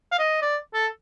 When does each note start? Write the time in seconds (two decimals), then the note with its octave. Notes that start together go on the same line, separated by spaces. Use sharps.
0.12 F5
0.19 D#5
0.42 D5
0.74 A4